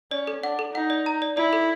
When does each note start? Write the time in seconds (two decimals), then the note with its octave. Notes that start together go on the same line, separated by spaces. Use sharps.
0.11 C#4 D5
0.27 A4
0.43 D4 F#5
0.59 A4
0.74 D#4 F#5
0.90 D5
1.06 A#5
1.22 D5
1.37 E4 D5
1.53 A4